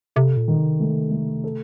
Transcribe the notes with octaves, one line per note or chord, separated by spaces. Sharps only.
C3 A4
A#2
D#3
C3
A3
A3
A4